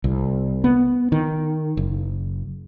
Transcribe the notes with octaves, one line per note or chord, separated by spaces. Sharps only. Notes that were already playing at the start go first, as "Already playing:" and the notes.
C2
B3
D#3
F#1